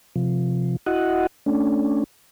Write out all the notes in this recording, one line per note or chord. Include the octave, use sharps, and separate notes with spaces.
C3 F3
E4 F#4 D#5 F#5
A3 C#4 D4